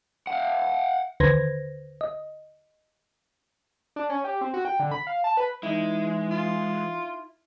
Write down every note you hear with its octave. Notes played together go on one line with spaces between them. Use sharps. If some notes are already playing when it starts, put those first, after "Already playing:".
F5 F#5
D#2 D3 B4 C5 G#6 A#6
D#5
D4
C#4
G4
C4
F#4
G5
D3
B5
F5
A5
B4
E3 G#3 D#4 E4
F4